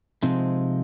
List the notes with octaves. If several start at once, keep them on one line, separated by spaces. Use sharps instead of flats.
C3 F3 G#3 C4 D#4